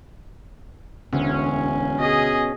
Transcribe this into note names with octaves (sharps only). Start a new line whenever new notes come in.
E1 D2 C#4
B2 G#4 D#5